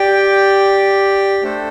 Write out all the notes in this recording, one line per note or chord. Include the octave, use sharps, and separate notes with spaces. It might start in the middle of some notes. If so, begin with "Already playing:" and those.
Already playing: G4 D5 G5
A3 D4 A4 C5